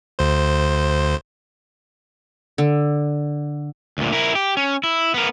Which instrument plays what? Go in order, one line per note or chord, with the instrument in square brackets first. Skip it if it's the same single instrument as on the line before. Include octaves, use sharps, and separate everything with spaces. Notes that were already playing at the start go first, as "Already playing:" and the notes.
[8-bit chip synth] D2 C5
[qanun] D3
[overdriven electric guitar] D2 A#2
E4 A#4
G4
C#4
E4
B3 A#4